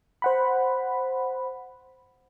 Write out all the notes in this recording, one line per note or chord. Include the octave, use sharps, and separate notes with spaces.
C5 F#5 B5